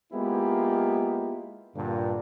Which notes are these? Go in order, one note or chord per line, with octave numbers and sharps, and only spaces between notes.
G#3 A#3 B3 E4 F4 G4
G2 A#2 D3